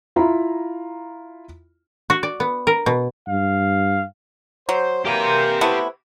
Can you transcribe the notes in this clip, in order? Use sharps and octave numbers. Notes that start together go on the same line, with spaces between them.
E4 F4 A#5 B5
F#4
D5
B3
A#4
B2
G2 F5
F#3 C5
E3 A#3 G4 A#4 A#5 C6 G6
A3 B3 E4 B4 C5